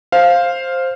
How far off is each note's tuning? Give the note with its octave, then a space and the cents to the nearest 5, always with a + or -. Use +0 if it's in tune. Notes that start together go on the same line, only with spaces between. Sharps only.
C5 +5 F5 +0